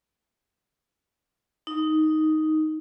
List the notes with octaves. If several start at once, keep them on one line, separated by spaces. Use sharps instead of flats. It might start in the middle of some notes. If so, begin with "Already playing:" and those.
D#4